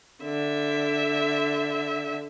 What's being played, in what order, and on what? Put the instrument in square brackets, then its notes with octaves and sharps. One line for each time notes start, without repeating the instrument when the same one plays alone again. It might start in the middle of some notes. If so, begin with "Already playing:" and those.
[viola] D3 E5